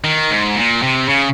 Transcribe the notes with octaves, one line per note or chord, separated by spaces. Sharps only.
D#3
G#2
A#2
C3
C#3